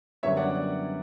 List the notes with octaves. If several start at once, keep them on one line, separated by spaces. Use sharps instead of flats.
F#2 D3 G3 B3 C#5 E5
D5 F#5